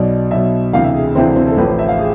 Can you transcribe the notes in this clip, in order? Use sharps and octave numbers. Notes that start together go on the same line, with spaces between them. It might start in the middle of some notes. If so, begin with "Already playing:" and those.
Already playing: B1 B2 D5
B1 B2 E5
D2 C3 E3 F5
E5
G#4
E4
D2 C3 E3 C4
D4
C4
A4
A1 A2 F3 B4
C5
E5
F5
G#4